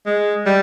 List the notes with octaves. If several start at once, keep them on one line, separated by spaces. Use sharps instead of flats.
G#3
G3